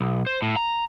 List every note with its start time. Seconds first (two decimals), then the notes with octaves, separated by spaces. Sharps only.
0.01 B1
0.27 C5
0.42 A2
0.56 A#5